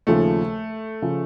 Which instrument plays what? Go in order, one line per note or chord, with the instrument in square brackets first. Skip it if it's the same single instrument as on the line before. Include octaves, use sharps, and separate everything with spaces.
[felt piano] D#2 C#3 F3 [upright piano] A3
[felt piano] C#3 F3